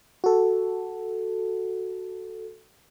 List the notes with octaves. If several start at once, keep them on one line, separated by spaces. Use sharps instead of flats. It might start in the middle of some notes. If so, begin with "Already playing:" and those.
F#4 A4